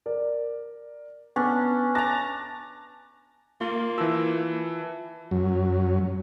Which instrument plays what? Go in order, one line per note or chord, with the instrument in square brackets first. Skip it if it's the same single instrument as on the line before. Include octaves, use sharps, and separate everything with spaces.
[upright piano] A#4 D5
[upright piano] B3 [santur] C#4 D4
[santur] A5 A#5 [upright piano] D6 F#6 A#6
[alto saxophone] A#3 [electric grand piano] F4
[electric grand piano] E3 E6 [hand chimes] F4 A5
[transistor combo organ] F#2